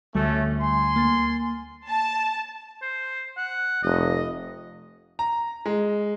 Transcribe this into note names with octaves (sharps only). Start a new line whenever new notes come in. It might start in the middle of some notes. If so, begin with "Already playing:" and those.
D2 G3 A3 C#4
G#5 C6
A#3 A6
A5
C5
F#5
F1 D#5
A#5
G#3